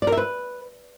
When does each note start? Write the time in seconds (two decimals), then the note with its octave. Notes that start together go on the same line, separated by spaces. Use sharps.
0.02 D5
0.07 A#4
0.12 E5
0.17 B4